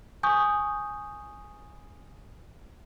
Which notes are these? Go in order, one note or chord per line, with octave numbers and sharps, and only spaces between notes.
G#5 C#6 D#6 G6